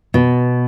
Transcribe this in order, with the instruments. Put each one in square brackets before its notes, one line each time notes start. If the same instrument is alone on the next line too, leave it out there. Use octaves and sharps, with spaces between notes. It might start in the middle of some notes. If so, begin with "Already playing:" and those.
[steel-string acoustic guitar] B2